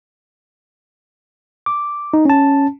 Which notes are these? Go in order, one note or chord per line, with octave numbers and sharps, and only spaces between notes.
D6
D#4
C#4 A5